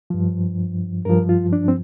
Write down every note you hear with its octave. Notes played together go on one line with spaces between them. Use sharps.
G2 F3
G2 F3 A#4
F4
D4
C4